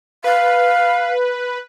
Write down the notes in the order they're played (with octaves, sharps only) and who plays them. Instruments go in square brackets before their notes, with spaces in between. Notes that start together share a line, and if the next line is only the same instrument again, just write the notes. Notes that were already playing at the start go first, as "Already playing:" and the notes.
[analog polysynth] B4 [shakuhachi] F5